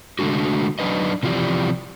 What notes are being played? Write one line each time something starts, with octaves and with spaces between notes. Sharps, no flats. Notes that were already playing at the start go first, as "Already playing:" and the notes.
D3 G#3 A3 D4 F#4
F#3 D4 D#4 B4 D#5
C3 E3 F3 F4 G4 D5